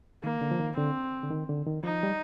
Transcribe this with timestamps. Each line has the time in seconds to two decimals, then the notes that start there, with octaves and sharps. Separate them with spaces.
0.24 D#3 A#3
0.41 D3
0.51 F3
0.60 D#3
0.77 D3 C4
1.23 D3
1.31 D#3
1.49 D3
1.66 D#3
1.84 F3 D#4
2.03 G3